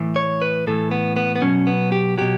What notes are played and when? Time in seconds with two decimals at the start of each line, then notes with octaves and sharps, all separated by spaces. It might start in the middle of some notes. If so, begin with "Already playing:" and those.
Already playing: A2 E3
0.16 C#5
0.42 B4
0.67 A2 E3 A4
0.91 B3
1.17 B3
1.36 B3
1.42 B2 F#3 C#4
1.67 B3
1.92 G4
2.18 B2 F#3 G4